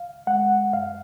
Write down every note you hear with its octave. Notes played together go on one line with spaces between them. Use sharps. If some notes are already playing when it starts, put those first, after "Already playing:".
Already playing: C#2 F5
G#3 F#5
F#2 F5